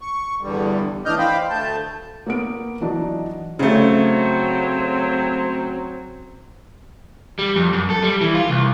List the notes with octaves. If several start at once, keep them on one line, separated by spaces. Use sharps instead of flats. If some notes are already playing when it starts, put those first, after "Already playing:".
C#6
E2 G2 D3 G3
A2 E3 D4 D#5 F6 G6
C5 F5 G5 B5
D2 A3 A5 G6
A#3 B3 D7
E3 F#3 D4 D#4
C#3 F#3 A3 C4
G3
F2
F#2
A4
G3
E3
F4
C2